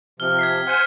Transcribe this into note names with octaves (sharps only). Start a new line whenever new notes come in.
C3 F3 F6 G7
G#6 B6 C7
C5 F#5 G#5 F6